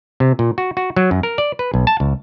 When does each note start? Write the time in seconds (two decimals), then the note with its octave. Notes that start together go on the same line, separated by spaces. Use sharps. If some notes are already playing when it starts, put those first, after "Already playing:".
0.20 C3
0.39 A#2
0.58 F#4
0.77 F#4
0.96 F#3
1.11 F#2
1.23 A#4
1.38 D5
1.59 B4
1.74 B1
1.87 A5
2.00 C#2